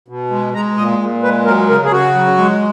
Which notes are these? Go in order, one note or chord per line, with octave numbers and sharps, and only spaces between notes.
B2
G#3
G#3 A#5
A#2 D#5
A#2
G#3 B4
F#3 A#4
C#3 A#4
G#4
C#3 F#4
F#3
G#3